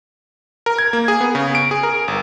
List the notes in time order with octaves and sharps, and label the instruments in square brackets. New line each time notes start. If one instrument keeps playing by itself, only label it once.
[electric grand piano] A#4
G#6
A#3
G#4
B3
C#3
D7
G#4
A#4
G1